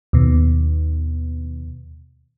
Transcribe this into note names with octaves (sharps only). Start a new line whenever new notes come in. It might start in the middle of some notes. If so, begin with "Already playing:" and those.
D#2 B2